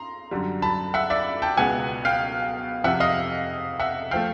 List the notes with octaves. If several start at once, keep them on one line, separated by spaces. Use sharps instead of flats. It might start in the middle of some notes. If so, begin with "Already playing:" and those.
Already playing: A#5 C6
F#2 D3 G3
A5 B5
E5 F#5
D5 E5
G5 A5
C#2 B2 G#3 B3 F#5 G#5
F5 G5
F2 C3 F3 E5 F#5
D#5 F5
E5 F#5
F3 A3 F5 G5